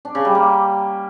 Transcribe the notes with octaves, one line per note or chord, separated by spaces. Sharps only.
D4
C#3
G3
A#3